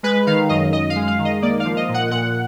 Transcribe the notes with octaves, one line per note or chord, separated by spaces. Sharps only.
G#3 B4
D#3 F5
F#2 D#5
F#2 D#5
F5
G#3
F5
D#3
D#5
A#3 D5
F5
F3
D#5
A#2
F#5
A#2 F#5